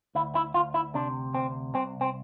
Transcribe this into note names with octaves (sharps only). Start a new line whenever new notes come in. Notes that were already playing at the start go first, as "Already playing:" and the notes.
D2 E4
E4
D2 F4
E4
C3 D4
D2 C4
C2 C4
C4